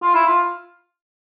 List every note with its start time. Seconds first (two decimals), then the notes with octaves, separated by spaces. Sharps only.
0.02 F4
0.14 E4
0.26 F4